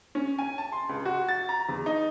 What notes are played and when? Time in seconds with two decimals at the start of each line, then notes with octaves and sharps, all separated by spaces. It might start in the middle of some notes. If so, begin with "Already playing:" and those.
0.15 C#4
0.38 G#5
0.58 A5
0.72 C6
0.89 C#2
1.05 F#4
1.29 A6
1.49 A#5
1.69 E2
1.86 D#4